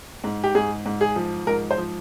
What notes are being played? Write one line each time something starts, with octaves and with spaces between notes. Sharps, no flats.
G#2
G4
G#2 G#4
G#2
G#4
F3
G#2 A#4
C5
F3